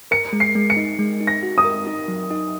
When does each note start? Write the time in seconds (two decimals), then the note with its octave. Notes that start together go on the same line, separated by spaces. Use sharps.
0.11 A#4 C#7
0.33 G#3
0.40 C7
0.55 G#3
0.70 C#7
0.77 D#4
0.99 G#3
1.21 D#4
1.27 A#6
1.43 F#4
1.58 D#6
1.65 A#4
1.87 D#4
2.08 F#3
2.31 D#4